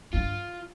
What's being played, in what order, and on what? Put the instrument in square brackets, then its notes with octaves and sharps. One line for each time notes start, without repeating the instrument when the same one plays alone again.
[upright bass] G2 [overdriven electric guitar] F4